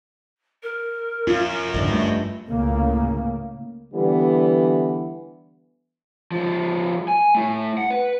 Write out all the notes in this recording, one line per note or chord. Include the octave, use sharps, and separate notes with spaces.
A#4
F#2 F4
G#1 F2 D3 D#5
G2 A3
C#2 A2 C#3 A#3
D3 E3 G3 B3
F3 G#3
G#5
A3 E4
F#5
B4